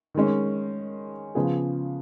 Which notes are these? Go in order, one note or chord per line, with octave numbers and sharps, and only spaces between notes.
D#3 G#3 C#4
C#3 F3 B3 F4 G#4